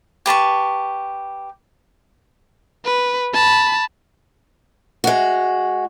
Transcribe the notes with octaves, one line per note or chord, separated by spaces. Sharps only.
G4 B4 A5 C#6
B4
A5 B5
G#3 F#4